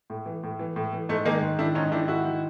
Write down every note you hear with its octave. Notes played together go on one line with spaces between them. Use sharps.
A2
E3
A2
E3
A2
E3
G#2 A3
D#3 G#3 A#3
G#2
D#3 D4 E4
G#2 C#4 D#4
D#3 D4 E4
G#2 E4 F#4
D#3